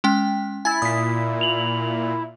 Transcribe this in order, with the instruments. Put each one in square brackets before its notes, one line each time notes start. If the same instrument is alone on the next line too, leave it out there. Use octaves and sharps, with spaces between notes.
[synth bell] G#3 C#4 G5
[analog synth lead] E4 [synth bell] G#5 G#6 A6
[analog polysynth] A#2 [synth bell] D#6 B6
[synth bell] F7 F#7